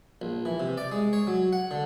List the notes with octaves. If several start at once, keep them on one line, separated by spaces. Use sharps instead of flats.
A#1
E3
C3
D5
G#3
C#5
F#3
F#5
D3